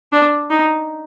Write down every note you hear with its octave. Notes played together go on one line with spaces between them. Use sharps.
D4
D#4